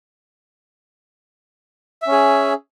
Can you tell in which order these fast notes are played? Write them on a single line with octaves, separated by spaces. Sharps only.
E5 C#4 G#4